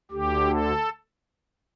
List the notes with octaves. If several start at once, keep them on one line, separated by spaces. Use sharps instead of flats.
D2 D3 G4
A4